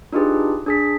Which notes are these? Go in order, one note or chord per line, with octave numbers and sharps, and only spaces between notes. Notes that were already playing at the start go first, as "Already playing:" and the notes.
D4 D#4 F4 G4 G#4 B4
D4 G#4 B6